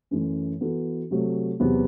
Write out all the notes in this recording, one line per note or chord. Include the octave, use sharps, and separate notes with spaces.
F#2 E3 A3
E3 B3 F#4 A4
C3 F#3 A3
E2 C3 F#3 B3 F#4